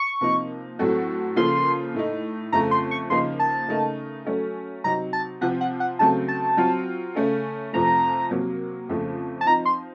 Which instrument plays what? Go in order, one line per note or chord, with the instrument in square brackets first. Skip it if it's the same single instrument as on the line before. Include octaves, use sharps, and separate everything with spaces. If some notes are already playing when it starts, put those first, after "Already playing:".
Already playing: [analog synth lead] C#6
[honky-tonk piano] C3 F3 A#3 D#4
A2 F#3 C4 F#4 A4
[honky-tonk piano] C#3 F3 A#3 F4 A4 [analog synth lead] C6
[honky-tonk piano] A2 A3 D#4
[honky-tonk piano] F2 C#3 A3 [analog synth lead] A#5
[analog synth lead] C6
C#6
[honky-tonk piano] C#3 F3 A#3 D#4 [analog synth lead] C6
[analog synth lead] A5
[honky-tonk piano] C#3 A3 D#4 A#4
F#3 A3 C#4 A4
[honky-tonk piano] C3 F#3 C4 D#4 [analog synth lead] A#5
[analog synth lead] A5
[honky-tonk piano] C3 F3 C4 F4 [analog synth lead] F#5
[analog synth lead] F#5
F#5
[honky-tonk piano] C#3 F#3 A3 C4 [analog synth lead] A5
[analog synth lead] A5
[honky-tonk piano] F#3 C4 F4
C#3 A3 C#4 A4
[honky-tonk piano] F2 C3 F3 A3 [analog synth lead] A#5
[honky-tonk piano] C3 F#3 A#3
F2 C#3 F3 A3
[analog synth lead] A5
[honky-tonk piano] F3 C4 D#4 [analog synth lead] A#5
[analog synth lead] C6